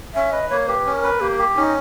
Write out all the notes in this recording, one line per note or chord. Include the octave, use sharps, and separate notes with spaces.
C#4 E5
B4 D#5
A#3 C#5
G4 B4
C#4
A#4
B4
A#3 G4
G4
C#4 D#4